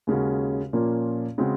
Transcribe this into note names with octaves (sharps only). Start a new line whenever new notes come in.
D#2 C#3 G#3 C#4 F#4
A#2 F3 A#3 C#4 F4
C#3 G#3 C4 F#4